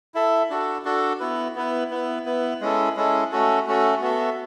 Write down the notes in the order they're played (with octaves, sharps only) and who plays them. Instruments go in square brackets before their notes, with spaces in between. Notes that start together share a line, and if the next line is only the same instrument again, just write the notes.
[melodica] E4 A4 E5
D4 F#4 A4
D4 F#4 A4
B3 E4 B4
B3 E4 B4
B3 E4 B4
B3 E4 B4
G#3 C#4 E4 A4
G#3 C#4 E4 A4
A3 C#4 F#4 A4
A3 C#4 F#4 A4
B3 F#4 A4 E5